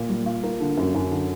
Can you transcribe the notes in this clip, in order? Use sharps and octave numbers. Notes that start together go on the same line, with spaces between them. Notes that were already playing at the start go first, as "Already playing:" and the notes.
Already playing: A#2
G3
F4
A#3
D3
F#2
F#2
D3